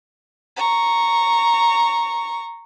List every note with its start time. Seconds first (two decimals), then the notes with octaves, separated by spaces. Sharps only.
0.56 A#5 C#6